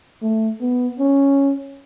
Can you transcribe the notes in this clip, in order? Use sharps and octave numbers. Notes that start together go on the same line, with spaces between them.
A3
B3
C#4